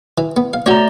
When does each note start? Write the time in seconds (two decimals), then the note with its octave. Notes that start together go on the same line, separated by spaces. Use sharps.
0.18 E3
0.37 B3
0.53 F5
0.66 A3 C#4 F#4 C#5 D5 A#5